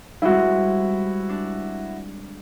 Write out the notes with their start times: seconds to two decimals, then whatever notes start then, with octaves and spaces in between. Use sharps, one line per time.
0.22 G3 G#3 C4 E4 F#4
1.29 D4